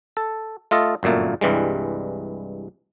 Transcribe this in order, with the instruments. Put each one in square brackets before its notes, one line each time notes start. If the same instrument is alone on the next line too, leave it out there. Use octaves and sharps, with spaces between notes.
[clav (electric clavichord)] A4
A3 F4 A4 D#5
G1 F#2 A#2 A3 A#3
C2 G2 E3 G3 G#3